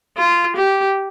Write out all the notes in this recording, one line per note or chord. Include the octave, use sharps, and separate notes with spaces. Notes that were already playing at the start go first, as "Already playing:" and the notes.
F4
G4